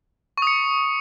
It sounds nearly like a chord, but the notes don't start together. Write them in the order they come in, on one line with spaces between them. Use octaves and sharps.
C#6 D#6 C#7